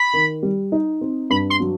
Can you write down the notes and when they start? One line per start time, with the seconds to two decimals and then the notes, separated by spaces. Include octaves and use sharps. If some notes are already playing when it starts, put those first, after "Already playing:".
Already playing: B5
0.13 D#3
0.43 G3
0.72 D#4
1.01 C4
1.30 G2 B5
1.50 C6
1.60 F#3